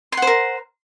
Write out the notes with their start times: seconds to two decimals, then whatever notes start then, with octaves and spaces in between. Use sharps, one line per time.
0.12 C6
0.17 F#5
0.22 C5
0.27 A#4